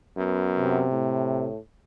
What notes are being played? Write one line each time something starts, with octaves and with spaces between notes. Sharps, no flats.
F#2 B3
C3
A2